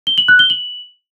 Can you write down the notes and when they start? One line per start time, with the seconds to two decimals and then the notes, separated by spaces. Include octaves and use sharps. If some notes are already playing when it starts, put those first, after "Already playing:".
0.07 G7
0.18 F#7
0.28 F#6
0.39 G7
0.50 F#7